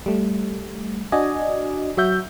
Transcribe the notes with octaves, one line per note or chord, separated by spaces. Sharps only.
G3 A3
D4 F#4 D5 D#5 G#5
F#3 F#4 E5 G6